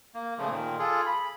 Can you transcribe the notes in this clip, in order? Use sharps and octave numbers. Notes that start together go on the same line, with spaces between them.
A#3
A#2 C#3 F3 A3
A#2 D#3
F4 G#4 A4
B5